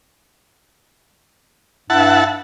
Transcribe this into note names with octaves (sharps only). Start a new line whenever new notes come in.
G2 E4 F#5 A5